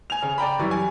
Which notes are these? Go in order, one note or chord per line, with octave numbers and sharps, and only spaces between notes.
G#5 F7
C#3
D5 G5 A#5 B5
F#2 E3 G3 C#6
G#5